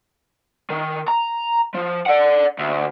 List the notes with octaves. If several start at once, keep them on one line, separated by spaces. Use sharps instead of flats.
D#3
A#5
F3
D5 F#5
D2